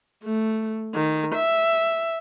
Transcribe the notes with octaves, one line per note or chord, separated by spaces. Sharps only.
A3
D#3
E5